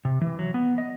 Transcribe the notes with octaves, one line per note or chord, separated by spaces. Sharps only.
C3
E3
F#3
B3
D#5